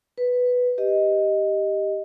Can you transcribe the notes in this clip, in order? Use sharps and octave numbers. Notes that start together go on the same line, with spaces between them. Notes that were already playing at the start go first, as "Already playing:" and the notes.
B4
G4 D#5